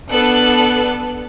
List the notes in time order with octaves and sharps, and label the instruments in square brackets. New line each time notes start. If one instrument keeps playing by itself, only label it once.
[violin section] B3 D4 A4 F#6